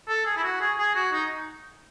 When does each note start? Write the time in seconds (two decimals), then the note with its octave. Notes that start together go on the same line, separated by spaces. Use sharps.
0.08 A4
0.26 G#4
0.37 E4
0.44 F#4
0.61 G#4
0.78 G#4
0.95 F#4
1.13 D#4